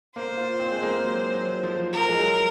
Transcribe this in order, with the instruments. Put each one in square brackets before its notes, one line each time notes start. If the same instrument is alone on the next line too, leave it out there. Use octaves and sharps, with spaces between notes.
[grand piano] A#3 [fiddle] C5
[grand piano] F4
C4
G#3
A#3
F#3
F#3
F3
[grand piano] F3 [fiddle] A#4
[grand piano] G#3
F#3